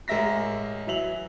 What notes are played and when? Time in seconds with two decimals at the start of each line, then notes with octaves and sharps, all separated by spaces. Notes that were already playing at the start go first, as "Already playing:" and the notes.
0.08 A1 G#3 A#4 E5 A#6 B6
0.87 E3 F#3 E5 F7 F#7